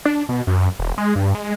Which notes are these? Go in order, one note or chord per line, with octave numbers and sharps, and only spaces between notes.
D4
B2
F#2
E1
G#3
G2
G#3